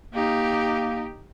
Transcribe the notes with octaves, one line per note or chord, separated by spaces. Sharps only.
A#3 D#4 G4